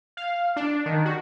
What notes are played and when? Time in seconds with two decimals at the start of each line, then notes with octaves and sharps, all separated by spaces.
0.17 F5
0.56 D4
0.86 D#3
1.05 F#4